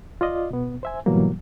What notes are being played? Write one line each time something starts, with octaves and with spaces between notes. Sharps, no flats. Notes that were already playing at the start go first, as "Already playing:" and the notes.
F4 D5 D#5
B2 B3
C5 E5 G#5
G#2 B2 E3 F#3 G3 A#3